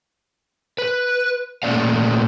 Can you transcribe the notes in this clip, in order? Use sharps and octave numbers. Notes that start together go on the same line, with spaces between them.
B4
A#2 A3 A#3 C#4 D5 F5